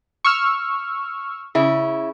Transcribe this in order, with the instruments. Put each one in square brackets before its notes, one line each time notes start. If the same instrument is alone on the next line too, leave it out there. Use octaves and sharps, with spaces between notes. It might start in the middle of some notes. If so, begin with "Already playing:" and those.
[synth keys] C#6 E6 F6
[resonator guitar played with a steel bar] C#3 E4